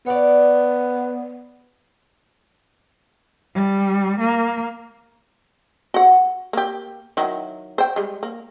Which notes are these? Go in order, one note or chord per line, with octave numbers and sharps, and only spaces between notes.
B3 C#5 D5
G3
A#3
F#4 F#5
A#3 G4
D#3 F#3 E4
C5 G5
G3 G#3
A#3